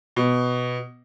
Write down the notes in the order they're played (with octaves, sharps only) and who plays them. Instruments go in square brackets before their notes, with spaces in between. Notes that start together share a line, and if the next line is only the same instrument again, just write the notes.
[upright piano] B2